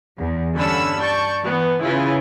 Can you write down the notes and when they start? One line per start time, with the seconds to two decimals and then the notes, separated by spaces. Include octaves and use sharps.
0.18 E2
0.55 G2 D3 C#4 B5 E6
1.01 D5 A5 C#6 G6
1.42 E3 B3
1.81 C#3 E4 F4 B4